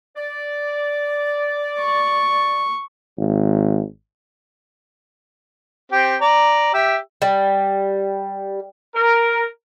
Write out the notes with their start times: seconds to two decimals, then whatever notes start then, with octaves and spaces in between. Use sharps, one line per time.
0.16 D5
1.80 C#6
3.18 G#1
5.92 C4 G4
6.21 D5 A#5
6.74 G4 E5 E6
7.22 G3
8.95 A#4